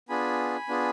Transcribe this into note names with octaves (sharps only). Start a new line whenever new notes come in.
B3 D4 F4 G#4 G#5 B5
B3 D4 F4 G#4